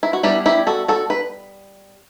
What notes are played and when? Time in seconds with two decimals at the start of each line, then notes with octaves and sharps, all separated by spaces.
0.03 E4
0.13 F#4
0.23 G3 B3 D4 E4 G4
0.46 E4 G4
0.67 F#4 A4
0.88 F#4 A4
1.10 B4